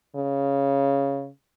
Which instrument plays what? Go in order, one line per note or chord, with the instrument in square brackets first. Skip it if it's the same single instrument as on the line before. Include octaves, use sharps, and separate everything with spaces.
[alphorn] C#3